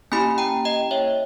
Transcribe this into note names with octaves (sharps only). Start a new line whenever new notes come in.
A#3 C#4 E4 G4 G#5 B5
G5 A#5
D#5 G5
C#5 E5